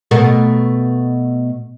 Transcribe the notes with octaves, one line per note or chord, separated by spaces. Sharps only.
B2 A3 A#4